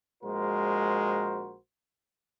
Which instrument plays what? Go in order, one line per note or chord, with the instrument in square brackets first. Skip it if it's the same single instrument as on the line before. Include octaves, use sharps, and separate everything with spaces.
[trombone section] A#1 G#3 F#4 A#4 C5